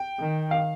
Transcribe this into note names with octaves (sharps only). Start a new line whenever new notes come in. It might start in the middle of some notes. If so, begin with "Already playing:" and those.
Already playing: G5
D#3
F5